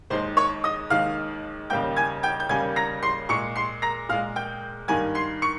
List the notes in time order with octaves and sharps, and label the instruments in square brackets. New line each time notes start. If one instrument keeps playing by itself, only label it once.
[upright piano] D#2 D#3 G#3 C5 C6
C#5 C#6
D#5 D#6
D#2 D#3 G#3 F5 F6
D#2 C#3 G3 A#3 G5 G6
G#5 G#6
G5 G6
G6
D#2 C#3 G3 A#3 G#5 G#6
A#5 A#6
C6 C7
A#2 G#3 C#6 C#7
C6 C7
A#5 A#6
A#2 G#3 F5 F6
G5 G6
G2 D#3 A#3 G#5 G#6
C6 C7
C#6 C#7